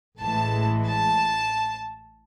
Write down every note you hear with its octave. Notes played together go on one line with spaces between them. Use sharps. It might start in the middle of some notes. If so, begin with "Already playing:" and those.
A1 A2 E3 G#3 A5
A5